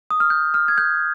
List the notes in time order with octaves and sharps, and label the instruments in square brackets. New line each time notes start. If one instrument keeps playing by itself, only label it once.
[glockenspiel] D#6
F6
G6
F6
G#6
G6